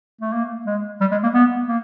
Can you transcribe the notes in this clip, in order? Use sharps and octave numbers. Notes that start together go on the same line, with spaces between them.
A3
A#3
G#3
G3
G#3
A#3
B3
A#3